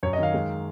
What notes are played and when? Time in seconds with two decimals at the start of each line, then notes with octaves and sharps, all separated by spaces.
0.03 F#2 C#5
0.13 D#5
0.18 D#3 F5
0.34 G#3